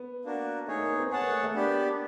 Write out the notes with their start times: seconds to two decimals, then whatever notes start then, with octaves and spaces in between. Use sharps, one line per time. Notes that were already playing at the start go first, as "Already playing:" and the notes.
Already playing: B3
0.25 A#3 D4 F#4 A#4
0.68 A3 D#4 G#4 C#5
0.79 A#3
0.89 B3
1.00 C4
1.11 B3 G#4 C#5 F#5 A5
1.22 A#3
1.32 A3
1.44 A3
1.54 A#3 B3 D4 G4 B4 D5